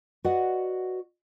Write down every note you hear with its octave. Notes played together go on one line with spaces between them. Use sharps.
F#4 B4 D5 D#5 F#5